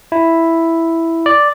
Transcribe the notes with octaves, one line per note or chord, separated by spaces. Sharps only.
E4
D5